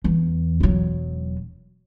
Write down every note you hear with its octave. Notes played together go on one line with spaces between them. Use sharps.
E2
E1 F#3